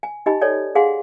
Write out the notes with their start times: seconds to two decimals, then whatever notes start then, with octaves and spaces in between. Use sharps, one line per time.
0.03 G#5
0.26 D#4 G4 D#5 G#5 B5
0.41 A4 C#5 D5 G#5
0.75 G#4 F5 F#5 G#5 C6